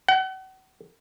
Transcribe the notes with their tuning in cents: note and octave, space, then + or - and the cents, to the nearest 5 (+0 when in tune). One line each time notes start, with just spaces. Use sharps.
F#5 +40